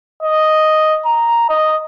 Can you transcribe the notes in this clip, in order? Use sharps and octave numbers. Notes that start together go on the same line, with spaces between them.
D#5
A#5
D#5